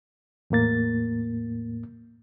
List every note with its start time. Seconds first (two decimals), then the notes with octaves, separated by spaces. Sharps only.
0.50 E2 A2 A#3 A6